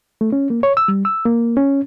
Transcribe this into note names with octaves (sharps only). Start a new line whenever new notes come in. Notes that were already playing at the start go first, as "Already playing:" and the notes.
A3
C#4
A#3
C#5
E6
G3
E6
A#3
C#4